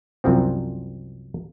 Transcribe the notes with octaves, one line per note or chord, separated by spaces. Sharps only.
C2 F#2 F3 C4